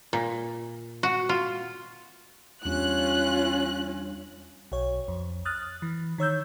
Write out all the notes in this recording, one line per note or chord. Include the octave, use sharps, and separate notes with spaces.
A#2
F#4
F4
E2 G3 C#4 D4 F4 F#6
B1 C#5
F2
D#6 F6 F#6 A6
E3
D#3 C#5 E6 G6